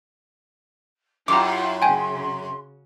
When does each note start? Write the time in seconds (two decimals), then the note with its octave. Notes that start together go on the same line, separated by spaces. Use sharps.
1.28 F#2 E4 F4 G4 A#5 C6 D6
1.82 C#3 G5 G#5